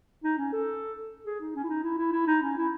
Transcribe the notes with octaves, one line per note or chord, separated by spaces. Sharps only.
D#4
C#4
A4
G#4
D#4
C#4
E4
D#4
E4
E4
E4
D#4
C#4
E4